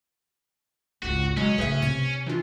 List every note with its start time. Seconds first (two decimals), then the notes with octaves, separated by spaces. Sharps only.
1.02 G#1 C#2 F#4
1.37 B2 E3 F#3 G#3 C#4
1.58 A2 C#3 G#4 B4 E5
1.82 C3 C4 G#6
2.26 E3 D4 F4